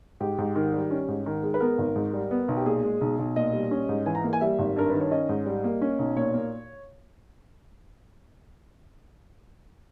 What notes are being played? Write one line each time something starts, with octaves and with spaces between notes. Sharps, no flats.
G#2 G4
G#2
D#3
G3
C#4
G#2
D#3
G#3
B4
B3 A#4
G#1
G#2
G3
B3
B1
G4
A#2 G#4
G#3
B1
B1
A#2 D#5
G3
C#4
G#2
E3 G#5
A#5
A#3
G#5
G3 E5
G#1
G2 A#4
D#3 B4
C#5
C#4 D#5
G#2
G3
A#3
C#4
B1
A#2 C#5
A#3